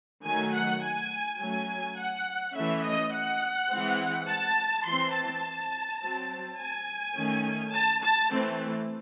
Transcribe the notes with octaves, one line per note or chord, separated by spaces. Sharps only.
D#3 F#3 A3 G#5
F#5
G#5
F#3 A3 C#4 G#5
F#5
E3 A3 C#4 E5
D#5
F#5
E3 G#3 C4
A5
E3 C4 C6
A5
F#3 C4
G#5
D#3 A3 C#4
A5
A5
E3 A3 C4